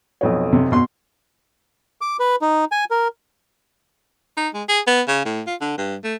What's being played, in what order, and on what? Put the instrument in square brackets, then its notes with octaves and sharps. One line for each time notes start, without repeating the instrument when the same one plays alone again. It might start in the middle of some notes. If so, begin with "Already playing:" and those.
[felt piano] B1 F2 C#5
[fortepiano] C3
B2 C6
[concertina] D6
B4
D#4
G#5
A#4
[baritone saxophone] D#4
G#3
G#4
B3
C#3
A2
F4
D3
G2
A3